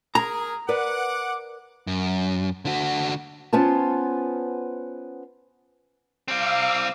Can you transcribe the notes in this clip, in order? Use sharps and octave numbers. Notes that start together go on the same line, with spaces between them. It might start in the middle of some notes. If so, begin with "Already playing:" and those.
G#4 A#4 A#5
A#4 B4 D5 F#5 D6
F#2
D3 F#4
B3 C#4 F4 C5 A5
G3 C4 F5 D6 E6